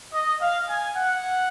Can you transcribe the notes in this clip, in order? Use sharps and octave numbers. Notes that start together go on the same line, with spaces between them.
D#5
F5
G#5
F#5